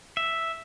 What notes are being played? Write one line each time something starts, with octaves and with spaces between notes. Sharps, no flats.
E5